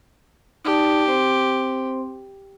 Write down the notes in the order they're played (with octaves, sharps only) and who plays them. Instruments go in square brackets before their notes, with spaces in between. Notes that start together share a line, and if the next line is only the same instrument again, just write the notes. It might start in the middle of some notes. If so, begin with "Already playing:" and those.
[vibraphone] D#4 D5 A5 [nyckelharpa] G4
[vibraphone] C4 C5 C6